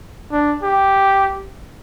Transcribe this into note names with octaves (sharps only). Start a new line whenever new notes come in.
D4
G4